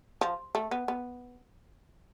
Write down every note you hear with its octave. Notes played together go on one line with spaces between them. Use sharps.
F3
A3
B3
B3